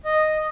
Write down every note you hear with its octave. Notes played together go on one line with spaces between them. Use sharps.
D#5